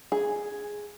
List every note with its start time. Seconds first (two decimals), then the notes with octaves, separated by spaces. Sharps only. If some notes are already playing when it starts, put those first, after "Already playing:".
0.12 G#4